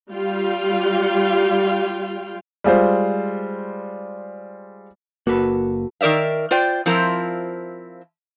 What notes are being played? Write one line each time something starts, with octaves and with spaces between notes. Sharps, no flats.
G3 F4 F5 G5
G3 G#3 F4 C5
F#1 A#3 F#4 A4 B4
D#3 A#4 D5 E5 F5
F4 C5 D5 G5
F3 C4 E4 F4 A#4